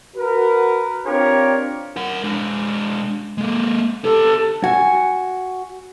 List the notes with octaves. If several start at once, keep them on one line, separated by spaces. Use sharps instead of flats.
F#4 A#4 B4
C4 D4 F4 G4 A#4 C#5
A#4 F#5
G#3 D4
G#3 A#3
B3 G4 A4
F#4 G#5